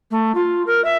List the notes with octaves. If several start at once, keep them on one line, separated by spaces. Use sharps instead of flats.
A3
F4
A#4
E5